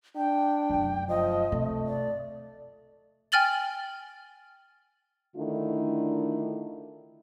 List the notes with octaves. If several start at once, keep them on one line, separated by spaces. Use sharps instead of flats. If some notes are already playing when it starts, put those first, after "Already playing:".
D4 G5
F1 F#2
F3 D#5
C3 A3
D5
G5 G#5 F6 A6 F#7 G7
D3 D#3 A3 D4 E4 F4